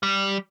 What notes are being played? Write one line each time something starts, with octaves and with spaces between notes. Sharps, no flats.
G3